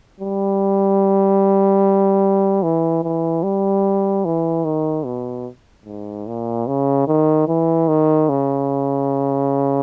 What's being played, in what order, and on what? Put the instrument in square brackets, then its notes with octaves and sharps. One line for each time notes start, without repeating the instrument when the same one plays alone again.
[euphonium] G3
E3
E3
G3
E3
D#3
B2
G#2
A#2
C#3
D#3
E3
D#3
C#3